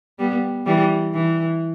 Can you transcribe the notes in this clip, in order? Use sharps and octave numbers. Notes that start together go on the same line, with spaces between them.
G3 B3
E3 G3
E3